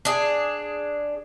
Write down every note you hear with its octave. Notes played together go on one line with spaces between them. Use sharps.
D4 G#4